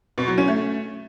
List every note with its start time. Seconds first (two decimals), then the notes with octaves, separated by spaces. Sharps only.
0.18 B2
0.28 F#3
0.38 C#4
0.48 A3